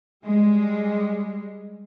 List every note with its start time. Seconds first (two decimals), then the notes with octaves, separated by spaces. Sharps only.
0.24 G3 G#3